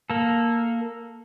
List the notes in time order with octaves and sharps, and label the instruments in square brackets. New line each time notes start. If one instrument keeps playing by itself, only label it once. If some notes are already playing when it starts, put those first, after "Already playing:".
[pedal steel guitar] A#3 A4